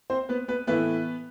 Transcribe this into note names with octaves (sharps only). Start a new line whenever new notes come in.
C4 C5
B3 B4
B3 B4
A2 E3 A3 B3 E4 B4